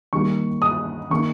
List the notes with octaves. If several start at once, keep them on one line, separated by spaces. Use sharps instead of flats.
D#3 G3 A#3 C#6
D#6
D#3 A#3 C#6